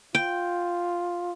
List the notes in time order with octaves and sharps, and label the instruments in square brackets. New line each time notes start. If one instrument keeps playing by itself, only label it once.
[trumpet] F4 [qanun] G5